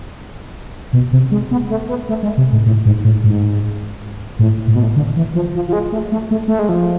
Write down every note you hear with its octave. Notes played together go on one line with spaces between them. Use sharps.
B2
C3
G#3
B3
A3
B3
A3
G#3
C3
A2
A2
G#2
A2
G#2
A2
A2
B2
A2
D3
E3
F3
F3
F3
G#3
A3
A3
A3
A3
G#3
F3